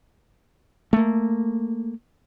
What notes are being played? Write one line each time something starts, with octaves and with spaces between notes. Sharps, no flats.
A3 A#3